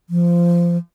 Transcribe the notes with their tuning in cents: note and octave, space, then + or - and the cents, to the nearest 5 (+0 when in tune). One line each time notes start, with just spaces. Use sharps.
F3 -15